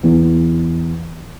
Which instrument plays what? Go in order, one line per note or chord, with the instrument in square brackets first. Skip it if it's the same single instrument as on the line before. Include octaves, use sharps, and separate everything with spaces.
[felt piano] E2